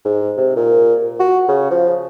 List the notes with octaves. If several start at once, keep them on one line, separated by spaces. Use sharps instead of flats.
G#2
C3
A#2
F#4
C#3
F3